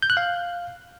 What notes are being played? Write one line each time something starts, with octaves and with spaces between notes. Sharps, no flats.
G6
F#6
F5